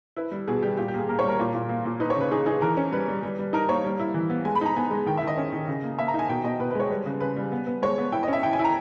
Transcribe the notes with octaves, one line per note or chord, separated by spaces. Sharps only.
E4 B4
G3
B2 G#4
G3 G4
A#2 G4
G4
A#3 G#4
A#3 A#4
C#5
G3 A#4
A#2
A#2
A#3
A#2
D#4 B4
C#5
C#3 B4
D#4 G#4
D#4 G#4
E3 A#4
C#4
G3 B4
G3
G3
G3
D#4 A#4
A#3 C#5
G3
E4
E3
B3
G#3 G#5
B5
D#4 A#5
B3 G#5
G#3
D#3 G5
E5
D#3
D#5
C#4
D#3
C#3
A#3
A#3 E5
A#5
D#4 G#5
B2 G5
B2 D#5
B2 B4
B4
G#3 C#5
G3 B4
C#3
C#3 B4
G3
B3
B3
G#3 C#5
B3
E4 G5
D#5
C#4
E5
E4 G5
G#5
E4
A#5